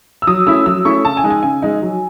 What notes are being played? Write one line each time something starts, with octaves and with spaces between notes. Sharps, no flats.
E6
F#3 D#6
A3 C#4 E4 E6
F#3 E6
A3 C#4 E4 C#6
C#3 A5
G#5
G#3 D#4
G#5
C#3 G#5
G#3 D#4
F#3